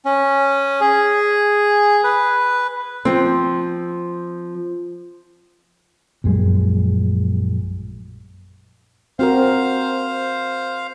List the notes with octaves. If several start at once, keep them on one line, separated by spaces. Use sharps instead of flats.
C#4
G#4
B4
F3 C4
A#1 F#2 G3 G#3
C4 F#4 A#4 C5 F5